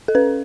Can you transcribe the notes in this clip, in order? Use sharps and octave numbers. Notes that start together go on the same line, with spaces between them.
A4
C#4 B4